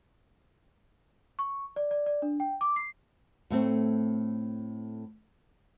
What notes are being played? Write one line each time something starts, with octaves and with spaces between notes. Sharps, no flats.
C#6
D5
D5
D5
D4
G5
D6
C7
A2 A3 C4